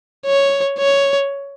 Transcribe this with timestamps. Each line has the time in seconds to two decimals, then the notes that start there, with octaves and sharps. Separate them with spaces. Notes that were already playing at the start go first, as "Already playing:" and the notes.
0.25 C#5
0.78 C#5